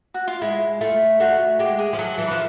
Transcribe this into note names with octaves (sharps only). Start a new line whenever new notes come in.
F#4
F4
G#3 E4
A3 F4
A3 F#4
G#3 G4
G#4
F3
F#3 A4
E3
F3 B4